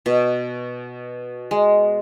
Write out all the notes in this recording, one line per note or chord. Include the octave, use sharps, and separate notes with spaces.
B2
G#3